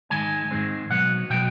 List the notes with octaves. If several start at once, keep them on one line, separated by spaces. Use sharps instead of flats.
G#2 D#3 G#3 G#5
G#2 D#3 G#3 C4
B2 F#3 B3 F#5
B2 F#3 B3 G5